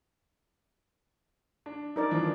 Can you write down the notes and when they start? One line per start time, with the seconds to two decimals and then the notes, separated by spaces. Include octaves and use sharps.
1.66 D4
1.96 D#4 A#4 D5
2.11 E3 F3 D4